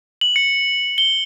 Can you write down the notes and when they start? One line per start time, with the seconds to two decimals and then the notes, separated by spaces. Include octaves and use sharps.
0.21 F#7
0.36 C#7
0.98 G7